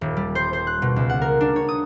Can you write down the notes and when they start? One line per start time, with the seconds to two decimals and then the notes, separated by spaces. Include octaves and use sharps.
0.01 D#1
0.17 G3
0.35 C5
0.53 C5
0.67 F#6
0.82 B2
0.96 C#2
1.10 F#5
1.22 A#4
1.41 D4
1.56 C#5
1.69 D#6